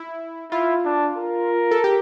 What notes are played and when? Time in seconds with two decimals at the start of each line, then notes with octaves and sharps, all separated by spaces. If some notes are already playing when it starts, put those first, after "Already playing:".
Already playing: E4
0.52 E4 F4
0.85 D4
1.18 A#4
1.71 A4
1.84 G4